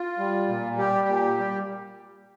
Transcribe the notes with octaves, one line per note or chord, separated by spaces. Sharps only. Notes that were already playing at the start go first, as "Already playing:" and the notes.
Already playing: F4
G3
A#2
G3 G4
A#2
G3